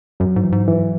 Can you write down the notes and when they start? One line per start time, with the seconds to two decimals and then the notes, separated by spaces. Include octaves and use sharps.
0.20 F#2 F#3
0.36 G#2
0.44 E3
0.52 G#2
0.68 E3